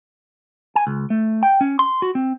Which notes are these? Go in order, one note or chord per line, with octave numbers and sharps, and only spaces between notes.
G#5
C#2
A3
G5
C#4
C6
F#4
C4